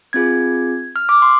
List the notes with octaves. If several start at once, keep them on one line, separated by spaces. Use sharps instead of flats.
C4 F4 G#4 G#6
F6
D6
C6